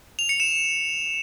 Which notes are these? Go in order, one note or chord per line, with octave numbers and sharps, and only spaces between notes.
F7
C#7
E7